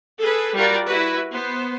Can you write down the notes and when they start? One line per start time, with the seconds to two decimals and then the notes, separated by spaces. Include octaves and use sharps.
0.20 G#4 A4 B4
0.55 G3 F4 F#4 A#4 D5 G5
0.86 E4 F#4 B4
1.32 B3 C5